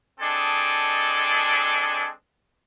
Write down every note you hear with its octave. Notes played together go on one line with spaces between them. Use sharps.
G#3 C4 D4 A4 D#5 G#5